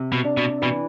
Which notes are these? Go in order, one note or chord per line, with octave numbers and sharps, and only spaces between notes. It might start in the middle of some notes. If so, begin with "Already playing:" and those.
Already playing: C3
B2
D4
B2
B2 E3